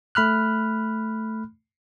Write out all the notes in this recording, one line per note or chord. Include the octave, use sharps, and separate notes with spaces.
A3 B5 F6 F#6